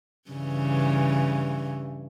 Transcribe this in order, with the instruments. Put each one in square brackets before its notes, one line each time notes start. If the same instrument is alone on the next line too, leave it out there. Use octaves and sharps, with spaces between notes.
[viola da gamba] G2 C#3 E3